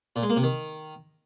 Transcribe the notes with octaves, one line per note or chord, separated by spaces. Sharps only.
A#2
G#3
A#3
C3
D#3